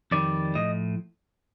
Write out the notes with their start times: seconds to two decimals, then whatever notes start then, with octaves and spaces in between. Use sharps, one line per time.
0.11 F2 D#3 G3 D5
0.55 A2 F3 D#5